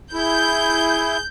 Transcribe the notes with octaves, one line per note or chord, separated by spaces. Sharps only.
E4 G#4 G6